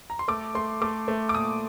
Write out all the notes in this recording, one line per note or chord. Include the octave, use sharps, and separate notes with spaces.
A#5
C6
A3 D6
A3 C6
A3 D6
A3
D6
A#2 D#6